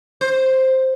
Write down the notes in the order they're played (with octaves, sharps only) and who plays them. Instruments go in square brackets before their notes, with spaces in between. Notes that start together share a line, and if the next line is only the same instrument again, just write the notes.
[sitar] C5